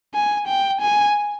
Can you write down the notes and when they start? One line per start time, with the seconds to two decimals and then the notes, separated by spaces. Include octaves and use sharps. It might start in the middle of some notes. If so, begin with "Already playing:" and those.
0.14 G#5
0.47 G5
0.81 G#5